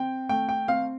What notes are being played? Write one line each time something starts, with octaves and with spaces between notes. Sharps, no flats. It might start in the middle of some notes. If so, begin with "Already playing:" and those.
Already playing: C4 G5
A3 G5
G5
C4 F5